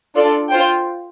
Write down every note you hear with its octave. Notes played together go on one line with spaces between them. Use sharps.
D4 F4 A4 D5
F4 C5 G5